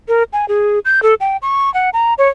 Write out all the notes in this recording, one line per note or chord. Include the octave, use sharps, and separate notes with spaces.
A#4
G#5
G#4
G6
A4
G5
C#6
F#5
A#5
C#5